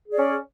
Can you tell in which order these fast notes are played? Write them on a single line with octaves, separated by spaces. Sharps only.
G#4 D5 C#4